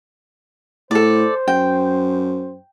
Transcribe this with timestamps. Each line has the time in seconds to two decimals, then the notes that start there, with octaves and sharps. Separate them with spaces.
0.91 A2 A4 C5 D5
1.48 F#2 G5